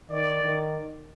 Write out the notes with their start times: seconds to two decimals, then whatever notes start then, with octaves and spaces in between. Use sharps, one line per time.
0.10 D#3 D5
0.42 D#3